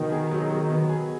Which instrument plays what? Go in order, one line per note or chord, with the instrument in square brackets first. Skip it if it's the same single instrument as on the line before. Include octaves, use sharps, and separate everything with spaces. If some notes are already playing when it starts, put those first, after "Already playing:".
Already playing: [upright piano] B2 [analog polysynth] D#3
[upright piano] G#4
F#3
F#3
B3
G#4